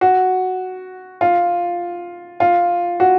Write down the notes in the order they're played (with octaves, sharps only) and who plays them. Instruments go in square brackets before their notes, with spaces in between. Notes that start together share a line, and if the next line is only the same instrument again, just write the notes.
[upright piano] F#4
F4
F4
F#4